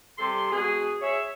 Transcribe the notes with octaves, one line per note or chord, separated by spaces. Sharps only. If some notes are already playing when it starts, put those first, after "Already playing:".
C3 G3 A4 C6
B2 G#3 F#4 G#4
G#4 C#5 E5